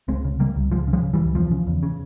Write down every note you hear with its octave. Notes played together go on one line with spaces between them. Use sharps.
C#2 G#3 C4
C#3
C#3 G3 A#3
C#2
C#2 F3 G#3
C#3
F3 G#3
C#3
E3 G3
C#2
E2 F3
C#3
E2
C#3